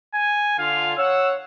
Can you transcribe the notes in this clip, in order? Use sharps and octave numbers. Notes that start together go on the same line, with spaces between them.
G#5
D3 F4 F5
C#5 F#5 E6